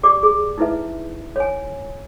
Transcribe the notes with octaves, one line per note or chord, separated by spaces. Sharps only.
G4 D5 D6
G#4
D#4 E4 B4 E5
C#5 G#5